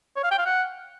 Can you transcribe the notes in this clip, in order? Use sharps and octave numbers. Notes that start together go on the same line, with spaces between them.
C#5
F5
G5
F5
F#5